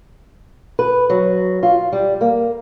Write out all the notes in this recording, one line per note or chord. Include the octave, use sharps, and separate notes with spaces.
B4
F#3
F4
G3
A#3